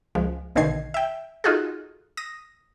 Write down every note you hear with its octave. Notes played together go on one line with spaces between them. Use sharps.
C#2 F3 G#3
A#1 B2 D3 D#3 G#6 C7
E5 G5
D#4 F4 F#4 G#4 A4
D#6 A#6